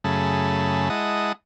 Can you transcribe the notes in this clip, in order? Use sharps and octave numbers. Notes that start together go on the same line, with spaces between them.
F#2 C#3 A3 G#4 A5 B5
G#3 E4 D#5 F#5 A5 D#6